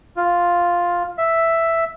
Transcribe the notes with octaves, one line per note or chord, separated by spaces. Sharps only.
F4
E5